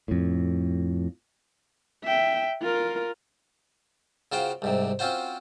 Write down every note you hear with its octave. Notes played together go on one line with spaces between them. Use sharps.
F2 A2
E5 G5
F4 A#4
C#3 F4 F#4 C5 G5
C2 G#2 C3
C4 C#4 F4 F#4 C5